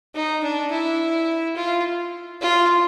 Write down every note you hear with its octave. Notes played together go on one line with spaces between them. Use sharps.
D#4
D4
E4
F4
F4